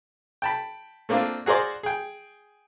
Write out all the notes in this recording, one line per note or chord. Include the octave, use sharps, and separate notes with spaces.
G5 A5 B5
A3 A#3 C4 D4 F4
F#4 G#4 A#4 C5 D5
G#4 G5